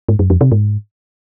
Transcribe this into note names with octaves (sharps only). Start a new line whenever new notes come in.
G#2
F#2
F2
C3
G#2